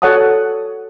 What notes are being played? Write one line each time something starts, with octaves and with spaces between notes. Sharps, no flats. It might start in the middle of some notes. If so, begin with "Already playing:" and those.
F#4 A4 C#5 F#5 A5 D#6